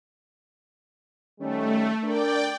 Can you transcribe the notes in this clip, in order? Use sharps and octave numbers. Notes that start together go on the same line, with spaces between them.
D#3 G3 A3 C#4
D4 A#4 D5 G5